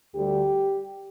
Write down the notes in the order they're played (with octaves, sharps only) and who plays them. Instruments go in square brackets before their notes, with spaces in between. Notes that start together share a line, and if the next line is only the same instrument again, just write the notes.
[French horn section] D2 D3 G3 G4